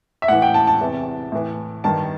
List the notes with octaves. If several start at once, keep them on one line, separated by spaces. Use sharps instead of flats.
E5
A2 E3 F#5
G5
A5
A5
E2 C3 E3
A2 E3
G2 D#3 A5